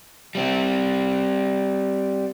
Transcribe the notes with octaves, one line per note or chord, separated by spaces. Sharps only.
G3 C4